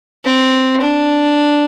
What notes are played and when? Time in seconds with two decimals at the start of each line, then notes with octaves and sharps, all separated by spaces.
0.25 C4
0.81 D4